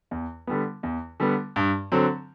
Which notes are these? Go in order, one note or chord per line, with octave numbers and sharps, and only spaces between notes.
E2
D3 G3 B3
E2
D3 G3 B3
G2
D3 F#3 C4